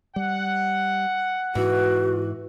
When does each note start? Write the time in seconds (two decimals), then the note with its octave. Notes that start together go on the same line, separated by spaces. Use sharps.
0.16 G3 F#5
1.55 G#2 E3 F#4